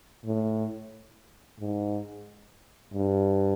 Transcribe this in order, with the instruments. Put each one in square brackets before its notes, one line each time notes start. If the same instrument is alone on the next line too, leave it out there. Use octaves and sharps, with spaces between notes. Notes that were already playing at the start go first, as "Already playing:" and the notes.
[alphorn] A2
G#2
G2